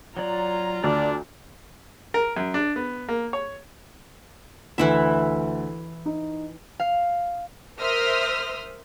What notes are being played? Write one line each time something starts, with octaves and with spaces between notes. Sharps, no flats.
F#3 F4 D5 A#5
D2 D4 D5 D6 F6
A#4
F#2
D4
B3
A#3
C#5
D2 E3 E4 E5
D#4
F5
A#4 C5 E5 C6 D#6 F6